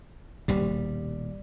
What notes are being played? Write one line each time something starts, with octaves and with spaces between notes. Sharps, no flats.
D#1 D#2 B2 G3